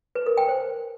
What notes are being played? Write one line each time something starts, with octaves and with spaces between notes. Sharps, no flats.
B4
A#4
G5
C5